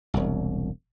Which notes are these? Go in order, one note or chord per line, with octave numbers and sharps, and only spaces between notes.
E1 C2